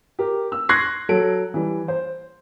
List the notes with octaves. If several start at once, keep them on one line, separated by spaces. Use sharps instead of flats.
G4 A#4
E6
C6 C#6 F#6 G#6 A#6 C7
F#3 A4 D7
E3 G3
C5